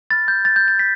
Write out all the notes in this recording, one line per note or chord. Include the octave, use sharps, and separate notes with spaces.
B5 F6 A6
G6
A6
G6
A6
B6